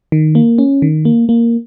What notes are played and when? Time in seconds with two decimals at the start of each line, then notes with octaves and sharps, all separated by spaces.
0.12 D#3
0.35 A#3
0.58 C#4
0.82 D#3
1.05 A#3
1.29 A#3